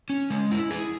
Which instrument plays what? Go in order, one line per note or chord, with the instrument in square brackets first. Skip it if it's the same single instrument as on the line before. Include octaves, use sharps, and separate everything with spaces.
[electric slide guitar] C#4
G#3
E4
G#4